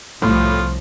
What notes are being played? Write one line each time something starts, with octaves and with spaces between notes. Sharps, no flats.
C2 A2 F3 F4